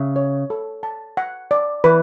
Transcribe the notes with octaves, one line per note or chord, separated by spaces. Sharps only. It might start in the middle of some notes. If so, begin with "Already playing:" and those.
Already playing: C#3 E5
C#5
A4
A5
F#5
D5
E3 B4